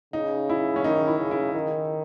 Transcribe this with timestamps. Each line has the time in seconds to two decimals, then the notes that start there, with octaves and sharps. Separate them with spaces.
0.13 C#3 D#4
0.49 E4
0.76 C#4
0.84 D#3 D#4
1.07 E4
1.19 C#3
1.31 E4
1.54 D#3 D#4